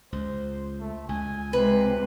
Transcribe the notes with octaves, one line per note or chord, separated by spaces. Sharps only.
C#2 C5
A3
C#2 G#5
C3 G#3 B4